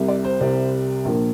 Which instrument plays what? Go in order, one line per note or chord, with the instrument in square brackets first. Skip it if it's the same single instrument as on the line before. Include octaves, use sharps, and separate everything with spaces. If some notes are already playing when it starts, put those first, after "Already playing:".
Already playing: [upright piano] C2 C3 G3
D5
C5
C2 C3 G3
A#1 A#2 F3 A#3